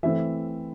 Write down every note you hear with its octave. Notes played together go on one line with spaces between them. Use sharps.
E3 A3 C4 E5